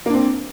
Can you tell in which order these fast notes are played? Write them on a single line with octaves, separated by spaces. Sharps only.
A#3 D4 C4